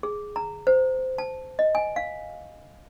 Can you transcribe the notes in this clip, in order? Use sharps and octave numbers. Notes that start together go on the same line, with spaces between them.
G#4
A#5
C5
A5
D#5
G#5
F5